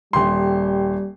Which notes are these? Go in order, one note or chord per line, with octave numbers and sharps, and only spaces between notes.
D#1 G3 C6